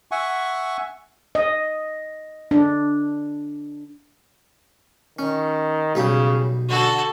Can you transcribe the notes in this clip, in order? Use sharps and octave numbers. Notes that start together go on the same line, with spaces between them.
E5 F#5 G#5 C#6
D#5
D4
D#3 C#4
B1 C#3 G3 D#6
D3 F#4 A4